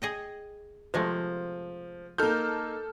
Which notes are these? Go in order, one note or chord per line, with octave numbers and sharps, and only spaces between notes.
G#4 D#5 G5
C3 F3 G#3 A3
A#3 D#4 A4 F6 G6